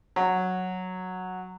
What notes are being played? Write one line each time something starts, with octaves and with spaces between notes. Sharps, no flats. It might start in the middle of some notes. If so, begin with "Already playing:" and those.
F#3